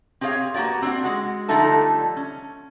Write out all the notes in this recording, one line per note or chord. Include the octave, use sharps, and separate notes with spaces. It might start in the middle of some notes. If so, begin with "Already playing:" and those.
C4 G4 G#4 C#5 F5
A#3 B3 F#4 G4 D5
C4 D4 F#4
G#3 F#4
D3 F3 G3 A3 D#4 A4
C#4